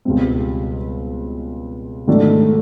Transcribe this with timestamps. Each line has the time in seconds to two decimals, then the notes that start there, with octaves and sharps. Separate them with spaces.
0.05 C#2 B2 G3 C4
2.08 G#2 D#3 F#3 A3 D4